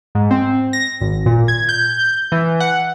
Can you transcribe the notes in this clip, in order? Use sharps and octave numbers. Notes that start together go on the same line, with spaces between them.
G#2
C4
A#6
G#1
A#2
G#6
G6
E3
F#5